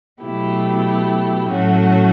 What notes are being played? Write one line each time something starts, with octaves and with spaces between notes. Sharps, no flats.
B2 F#3 A3 E4 G4
A2 F#3 A3 C#4 F#4